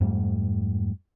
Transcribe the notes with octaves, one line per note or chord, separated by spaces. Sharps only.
F2 G#2 G3 A3